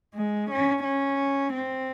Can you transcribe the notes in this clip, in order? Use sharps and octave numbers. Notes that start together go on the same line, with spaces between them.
G#3
C#4
C#4
C4